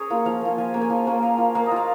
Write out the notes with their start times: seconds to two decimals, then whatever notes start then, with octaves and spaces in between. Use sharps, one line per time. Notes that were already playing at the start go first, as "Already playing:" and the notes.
Already playing: C#4 G#4 A#4 C#5
0.10 A#3 F4
0.25 F3 F5
0.41 A#3 F4
0.57 F3 G#5
0.74 A#3 C#4
0.82 G#5
0.90 F3
1.07 A#3 C#4
1.22 A#3 F5
1.38 F4
1.55 A#3 F5
1.66 D#5
1.71 F4 F5